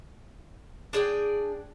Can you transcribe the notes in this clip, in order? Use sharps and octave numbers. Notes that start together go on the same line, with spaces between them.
D4 G#4 D5 G5